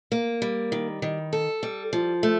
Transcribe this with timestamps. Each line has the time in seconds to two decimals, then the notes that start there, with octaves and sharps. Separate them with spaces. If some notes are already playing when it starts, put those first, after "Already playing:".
0.12 A#3
0.42 G3
0.72 D#3
1.02 D#3
1.33 A4
1.63 G3
1.93 F3
2.23 A3